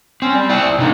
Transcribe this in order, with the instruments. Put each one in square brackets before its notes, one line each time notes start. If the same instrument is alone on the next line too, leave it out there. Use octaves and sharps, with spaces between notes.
[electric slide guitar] C4 [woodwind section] C#4
[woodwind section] G3
[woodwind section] C4 [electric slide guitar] E4 D5
[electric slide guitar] B2 D4 [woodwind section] G#3 D#4